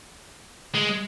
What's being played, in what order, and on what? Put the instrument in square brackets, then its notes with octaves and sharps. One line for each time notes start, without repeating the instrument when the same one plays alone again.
[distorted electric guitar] G#3